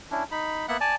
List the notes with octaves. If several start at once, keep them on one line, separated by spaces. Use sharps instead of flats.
C#4 D4 E4
D#4 B5
A#3 B3 E5 F#5 F#6
D5 G#5 A5